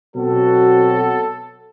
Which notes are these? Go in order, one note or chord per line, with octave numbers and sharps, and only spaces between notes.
B2 F#3 C4 F#4 A4